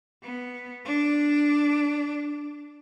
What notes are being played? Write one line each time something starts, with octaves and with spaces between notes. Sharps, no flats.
B3
D4